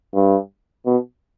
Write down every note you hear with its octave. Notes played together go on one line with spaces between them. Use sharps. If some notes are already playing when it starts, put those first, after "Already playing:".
G2
B2